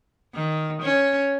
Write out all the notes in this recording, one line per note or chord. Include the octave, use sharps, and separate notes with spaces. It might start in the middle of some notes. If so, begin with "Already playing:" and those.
D#3
C#4